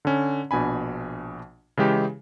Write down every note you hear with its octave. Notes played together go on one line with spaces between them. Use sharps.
D3 C#4
A#1 B2 D4 G#5 B5
C#3 E3 G#3 G4